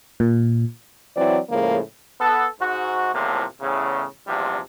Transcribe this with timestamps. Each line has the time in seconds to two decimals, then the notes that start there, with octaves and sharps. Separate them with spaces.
0.20 A#2
1.16 E3 F#3 C4 E4 D5
1.49 A2 C#3 F3 G#3 A#3
2.21 B3 A4
2.61 G#2 F#4
3.14 E2 A2 C3 F3 A#3
3.61 E2 A2 C#3
4.27 A#1 E2 C3 F3 G3